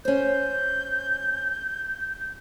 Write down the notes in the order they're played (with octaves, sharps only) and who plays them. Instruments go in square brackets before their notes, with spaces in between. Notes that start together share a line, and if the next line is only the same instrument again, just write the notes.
[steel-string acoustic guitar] C#4 C5 [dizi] G6